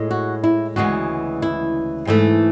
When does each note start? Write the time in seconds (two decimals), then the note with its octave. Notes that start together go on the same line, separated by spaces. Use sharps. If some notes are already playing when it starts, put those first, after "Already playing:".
Already playing: A2 G#3
0.11 F#4
0.44 E4
0.76 D2 C#3 E3 G#3 B3 F#4
1.42 E4
2.07 G#2 E3 A3